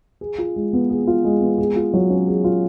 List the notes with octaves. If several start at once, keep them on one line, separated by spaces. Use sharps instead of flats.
G#4
F4
G#3
B3
G#4
F4
G#3
B3
G#4
F4
F#3
C#4
G#4
F4